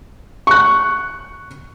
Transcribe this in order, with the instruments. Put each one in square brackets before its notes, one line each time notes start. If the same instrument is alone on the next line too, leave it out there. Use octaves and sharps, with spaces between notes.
[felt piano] C#6 F#6